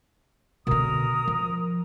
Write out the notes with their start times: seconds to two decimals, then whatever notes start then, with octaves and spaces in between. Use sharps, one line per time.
0.67 B2 D3 A#4 D#6
1.27 F3